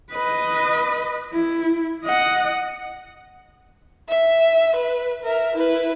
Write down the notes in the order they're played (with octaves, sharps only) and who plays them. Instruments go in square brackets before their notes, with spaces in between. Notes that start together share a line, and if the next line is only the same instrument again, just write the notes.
[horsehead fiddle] B4 D#5
E4
D#5 F#5
[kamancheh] E5
B4
A#4 E5
E4 B4